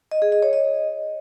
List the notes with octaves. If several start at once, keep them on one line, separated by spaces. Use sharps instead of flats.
D#5
G#4
D#5
C#5
D#5